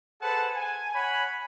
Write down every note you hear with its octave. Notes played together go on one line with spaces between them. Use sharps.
G#4 A4 B4 C5 F#5 A5
G#5
C#5 F#5 G#5 B5